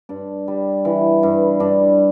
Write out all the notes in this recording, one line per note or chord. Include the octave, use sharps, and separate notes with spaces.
G2 D4
G3
E3
G2
G2 D4